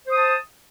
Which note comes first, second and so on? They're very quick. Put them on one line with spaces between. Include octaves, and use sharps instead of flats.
C5 D#6 A5